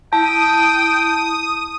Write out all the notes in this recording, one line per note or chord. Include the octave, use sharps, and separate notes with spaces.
E4 G5 A5 D#6